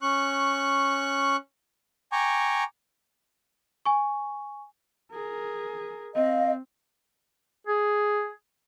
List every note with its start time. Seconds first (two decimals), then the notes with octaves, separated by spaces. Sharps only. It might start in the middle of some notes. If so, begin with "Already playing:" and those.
0.02 C#4 C#6 F#6
2.12 G5 G#5 A#5 C#6 D6
3.85 G#5 C#6
5.12 G#4 A#4
6.15 C4 D#5 F5
7.67 G#4